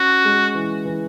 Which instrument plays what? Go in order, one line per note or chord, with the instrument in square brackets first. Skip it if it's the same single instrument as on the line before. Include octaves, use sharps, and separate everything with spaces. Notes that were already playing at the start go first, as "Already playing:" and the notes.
Already playing: [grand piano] C#4 [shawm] F#4
[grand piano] G#3
E3
E3